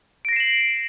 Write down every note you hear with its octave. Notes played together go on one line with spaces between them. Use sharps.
A#6 C7 D7 E7 F#7